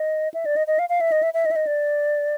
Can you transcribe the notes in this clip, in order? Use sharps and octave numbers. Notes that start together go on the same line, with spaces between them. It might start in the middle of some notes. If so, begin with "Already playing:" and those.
Already playing: D#5
E5
D5
D#5
D#5
F5
F5
E5
D#5
E5
E5
D#5
E5
D#5
D5